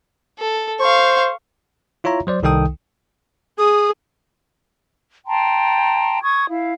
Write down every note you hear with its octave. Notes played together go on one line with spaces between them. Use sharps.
A4
C5 F5 C#6
E4 F4 C#5 E5 A#5
F#3 C5 D5
C2 D#3 D#4 A4 G5 D#6
G#4 D#6
G5 A5 A#5 C6
C#6 D#6 G#6
E4 F5